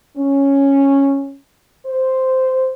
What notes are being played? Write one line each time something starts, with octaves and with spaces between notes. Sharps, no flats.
C#4
C5